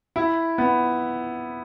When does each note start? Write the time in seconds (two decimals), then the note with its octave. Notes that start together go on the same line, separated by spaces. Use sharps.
0.16 E4
0.58 B3